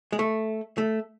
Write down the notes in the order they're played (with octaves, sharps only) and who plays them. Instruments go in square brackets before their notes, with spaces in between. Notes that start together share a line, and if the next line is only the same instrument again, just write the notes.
[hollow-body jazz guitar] G#3
A3
A3